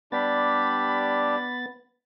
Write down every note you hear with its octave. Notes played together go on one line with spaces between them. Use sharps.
G3 B3 D4 G4 B5 A6